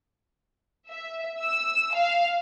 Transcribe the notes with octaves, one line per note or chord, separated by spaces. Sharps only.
E5
E6
F5